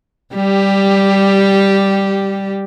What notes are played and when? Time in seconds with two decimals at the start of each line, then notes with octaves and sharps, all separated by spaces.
0.35 G3 G4